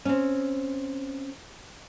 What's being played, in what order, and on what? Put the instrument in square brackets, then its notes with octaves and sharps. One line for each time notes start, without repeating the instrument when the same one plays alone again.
[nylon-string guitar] C4 C#4